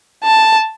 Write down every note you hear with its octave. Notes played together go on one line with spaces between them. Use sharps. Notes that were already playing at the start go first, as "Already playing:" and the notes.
A5